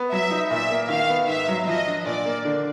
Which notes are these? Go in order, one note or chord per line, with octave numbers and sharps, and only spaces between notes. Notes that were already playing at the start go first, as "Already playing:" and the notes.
Already playing: B3
F#3 E5
D#4
A#2 E5
A#3
D#3 F5
B3
G#2 E5
F#3
F3 D#5
D4
A#2 D5
A#3
D3